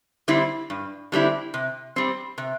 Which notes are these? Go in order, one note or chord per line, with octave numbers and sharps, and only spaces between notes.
D3 G3 C4 E4
G2
D3 G3 C4 E4
C3
G3 C4
C3